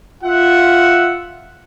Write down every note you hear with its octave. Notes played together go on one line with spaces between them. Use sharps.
F4 E5 F#5